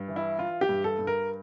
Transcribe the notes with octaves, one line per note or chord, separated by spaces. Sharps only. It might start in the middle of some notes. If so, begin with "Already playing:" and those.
Already playing: G2
E3
E4
E3 F4
G4
G2
A4
G2
A#4